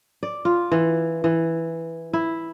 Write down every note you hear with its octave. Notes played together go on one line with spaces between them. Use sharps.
D5
F4
E3
E3
E4